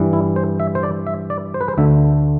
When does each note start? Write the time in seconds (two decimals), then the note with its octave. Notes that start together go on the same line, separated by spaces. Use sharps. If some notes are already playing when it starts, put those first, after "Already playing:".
Already playing: G2 E3 G3
0.13 E4
0.36 C5
0.60 E5
0.75 C5
0.83 D5
1.07 E5
1.30 D5
1.54 C5
1.61 B4
1.68 C5
1.77 D2 D3 A3 E5